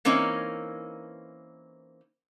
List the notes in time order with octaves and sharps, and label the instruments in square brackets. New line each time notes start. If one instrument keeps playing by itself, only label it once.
[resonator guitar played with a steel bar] E3 A#3 C4 C#4 D#4